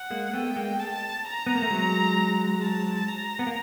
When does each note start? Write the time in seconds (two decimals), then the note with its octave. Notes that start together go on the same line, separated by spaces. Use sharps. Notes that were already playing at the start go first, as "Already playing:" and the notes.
Already playing: F#5
0.10 G#3 A#3
0.33 A3 B3 G5
0.56 G#3 A#3
0.79 A5
1.25 A#5
1.46 B3
1.55 A#3
1.62 A3
1.70 F#3 G#3
2.62 A5
3.09 A#5
3.39 B3
3.47 A#3